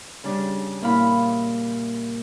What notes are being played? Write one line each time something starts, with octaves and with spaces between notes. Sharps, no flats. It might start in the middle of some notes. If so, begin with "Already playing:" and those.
C#3 G3 D4
A#2 E4 F5 B5